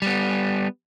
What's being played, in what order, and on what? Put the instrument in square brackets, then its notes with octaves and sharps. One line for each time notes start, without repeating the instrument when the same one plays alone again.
[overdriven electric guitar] G3 B3